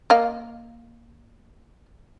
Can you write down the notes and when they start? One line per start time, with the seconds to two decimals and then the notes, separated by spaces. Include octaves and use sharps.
0.10 A#3 D#5 F5